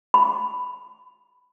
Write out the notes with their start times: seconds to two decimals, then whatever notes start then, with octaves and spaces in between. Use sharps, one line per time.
0.14 B5